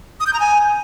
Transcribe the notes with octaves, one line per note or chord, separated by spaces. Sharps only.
D#6
G6
A#5
G#5